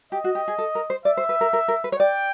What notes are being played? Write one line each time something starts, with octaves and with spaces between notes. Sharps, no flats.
G4 D#5
F#4
G4
G#4
A4
A#4
C5
D5 E5
C5
B4
A#4
A#4
A#4
B4
C#5
D5 G5